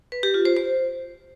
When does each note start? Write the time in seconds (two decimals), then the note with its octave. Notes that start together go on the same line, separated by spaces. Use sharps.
0.12 B4
0.23 G4
0.34 F4
0.45 C5
0.57 C5